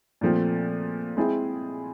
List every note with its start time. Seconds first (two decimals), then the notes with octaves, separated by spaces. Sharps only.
0.21 A#2 F3 A3 C4
1.17 G#3 C4 E4 G#4